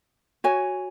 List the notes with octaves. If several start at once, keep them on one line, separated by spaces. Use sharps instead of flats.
F#4 C#5 G#5